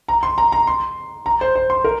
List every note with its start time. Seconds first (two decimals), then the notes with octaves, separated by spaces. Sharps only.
0.08 A#5
0.23 C6
0.38 A#5
0.52 A#5
0.67 C6
1.26 A#5
1.41 C5
1.56 C5
1.70 C6
1.84 A#4